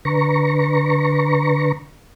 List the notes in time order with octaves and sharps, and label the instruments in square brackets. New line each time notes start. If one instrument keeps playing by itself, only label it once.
[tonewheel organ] D3 B4 A#5 C#6